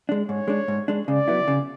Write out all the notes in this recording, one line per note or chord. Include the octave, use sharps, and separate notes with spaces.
G#3 D4
G#2 C#5
G#3 D4
G#2
G#3 D4
C#3 D5
F#3 B3 E4
C#3